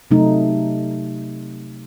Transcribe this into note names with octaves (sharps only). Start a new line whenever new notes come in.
C3 F#3 A3 D#4